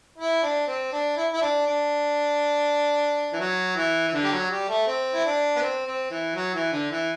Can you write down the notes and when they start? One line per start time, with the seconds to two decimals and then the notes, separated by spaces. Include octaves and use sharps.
0.18 E4
0.43 D4
0.67 C4
0.92 D4
1.17 E4
1.33 E4
1.42 D4
1.66 D4
3.33 E3
3.39 F#3
3.76 E3
4.08 E3
4.14 D3
4.23 G3
4.32 F#3
4.50 G3
4.69 A3
4.87 C4
5.14 E4
5.24 D4
5.56 B3
5.61 C4
5.86 C4
6.11 E3
6.35 F#3
6.54 E3
6.72 D3
6.91 E3